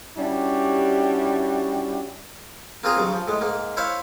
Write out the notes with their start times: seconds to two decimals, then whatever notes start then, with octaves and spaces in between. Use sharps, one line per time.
0.16 G3 C#4 D4 E4 F#4 G4
2.84 A#3 C4 F4 G#4 A#5
2.97 G2 C#3 F#3
3.13 F3
3.28 A2 G#3
3.41 G#2 A#3
3.77 E4 C5 C#5 E5 F5